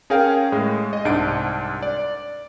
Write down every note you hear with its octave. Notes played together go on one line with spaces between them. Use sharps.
C#4 G#4 A#4 F5 G5
A2 G#3
D#5
C2 G#2 D4 D7
D5